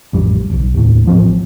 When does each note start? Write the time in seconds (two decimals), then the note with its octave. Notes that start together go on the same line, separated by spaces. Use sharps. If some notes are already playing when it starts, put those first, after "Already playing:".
0.13 A1 F2 G3
0.50 D#1 B1
0.74 D#2 A2
1.06 A1 F3 C4